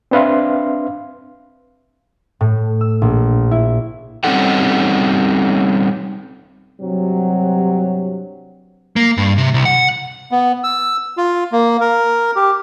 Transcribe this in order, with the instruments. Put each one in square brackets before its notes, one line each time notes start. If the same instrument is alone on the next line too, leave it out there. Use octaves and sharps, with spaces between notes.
[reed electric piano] C4 D4 B4 E5 F5 C6
[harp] A2
E6
A#1
E4
[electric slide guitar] G3 C4 C#4 D#4 A4 F#5
[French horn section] G2 C3 F#3
[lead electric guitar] A#3
G2
C3
C2
F#5
[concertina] B3
E6
F4
A#3
A#4
G4